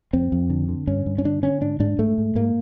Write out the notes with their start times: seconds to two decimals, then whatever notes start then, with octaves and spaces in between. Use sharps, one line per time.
0.13 F2 C4
0.32 F2
0.50 D3
0.68 D3
0.87 G2 C#4
1.06 G2
1.18 C#4
1.25 D3 D4
1.42 D3 C#4
1.61 G#2 D4
1.80 G#2 D4
1.99 G#2 A3
2.18 G#2
2.35 G#2 A#3